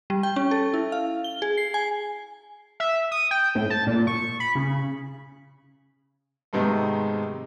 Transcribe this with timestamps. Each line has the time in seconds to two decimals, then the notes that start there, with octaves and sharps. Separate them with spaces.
0.10 G3
0.23 G5
0.36 C#4
0.51 A4
0.74 E4
0.92 F5
1.24 G7
1.42 G#4
1.57 C7
1.74 G#5
2.80 E5
3.11 D#6
3.31 G5
3.55 A2
3.70 A5
3.87 A#2
4.07 C#6
4.40 B5
4.55 C#3
6.53 G#2 C3 D#3 G#3 A3 B3